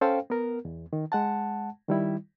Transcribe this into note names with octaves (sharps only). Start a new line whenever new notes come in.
C#4 A4 C5 F5 G5
B3 A#4
E2
D#3
G#3 F#5 A5
D#3 G3 E4